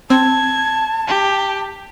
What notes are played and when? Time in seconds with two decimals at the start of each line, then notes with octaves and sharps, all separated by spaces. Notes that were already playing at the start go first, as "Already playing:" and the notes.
0.10 C4 A5 G#6
1.07 G4